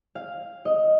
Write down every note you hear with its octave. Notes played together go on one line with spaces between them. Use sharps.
F5
D#5